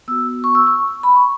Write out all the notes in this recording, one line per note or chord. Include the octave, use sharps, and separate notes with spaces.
B3 F#4 E6
C#6
E6
C#6
B5
C#6